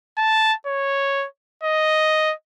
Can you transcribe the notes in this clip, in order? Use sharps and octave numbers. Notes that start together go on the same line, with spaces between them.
A5
C#5
D#5